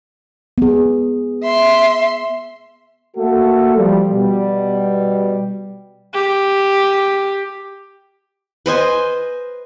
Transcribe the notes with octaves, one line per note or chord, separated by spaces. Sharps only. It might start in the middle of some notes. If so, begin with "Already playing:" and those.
B3 G#4
E5 C6
A3 A#3 F#4 A4
F3 G3
B2 G3
G4
B4 C5 D#5 G#5